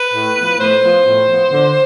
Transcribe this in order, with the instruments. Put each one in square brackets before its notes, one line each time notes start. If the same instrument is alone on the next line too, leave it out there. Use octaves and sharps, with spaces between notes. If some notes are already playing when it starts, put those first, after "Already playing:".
Already playing: [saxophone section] B4
A2
F3 B3
A2 C5
F3 B3
A2
F3 B3
D3